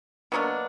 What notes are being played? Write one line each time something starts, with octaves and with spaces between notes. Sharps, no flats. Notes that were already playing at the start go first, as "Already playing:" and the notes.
B2 F#3 A#3 D4